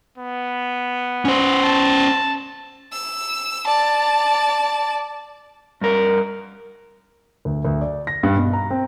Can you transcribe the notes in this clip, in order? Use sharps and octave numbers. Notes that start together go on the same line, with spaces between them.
B3
C#4 C5
A5
E6
D5 A5
G2 A#4
D2
D2
D5
A#6
G2
B2
A#5
C4